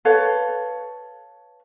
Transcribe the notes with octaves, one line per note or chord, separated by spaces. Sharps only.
A4 B4 C#5 F5